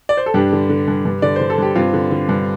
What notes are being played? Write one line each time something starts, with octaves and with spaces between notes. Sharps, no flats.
D5
C5
A4
G2 D4 G4
D3
D3
G2
G2
D3 D5
D3 C5
A4
G2 G4
G2 C4 F4
D3
D3
G2